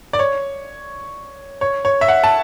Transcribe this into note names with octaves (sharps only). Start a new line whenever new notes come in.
D5
C#5
C#5
C#5
E5
F#5
A5